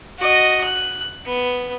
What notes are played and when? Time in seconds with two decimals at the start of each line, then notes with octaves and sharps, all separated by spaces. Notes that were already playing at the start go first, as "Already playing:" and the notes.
0.19 F#4 D#5
0.64 F#6
1.26 B3